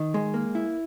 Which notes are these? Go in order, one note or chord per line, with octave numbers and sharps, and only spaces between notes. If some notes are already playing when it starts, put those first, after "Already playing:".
Already playing: D#3
G#3
A#3
E4